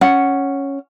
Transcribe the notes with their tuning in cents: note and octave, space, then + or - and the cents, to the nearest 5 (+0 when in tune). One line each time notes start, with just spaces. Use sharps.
C#4 +0 F#5 +0